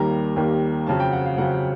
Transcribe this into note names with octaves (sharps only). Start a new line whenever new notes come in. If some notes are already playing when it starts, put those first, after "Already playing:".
Already playing: D#2 D#3 G3 A#3 A#5
D#2 D#3 G3 A#3
F2 C#3 F#3 A5
G5
F#5
F5
F2 C#3 F#3 F#5